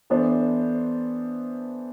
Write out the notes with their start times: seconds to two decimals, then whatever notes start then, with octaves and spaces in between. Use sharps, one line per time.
0.10 E3 B3 D4 A4 C5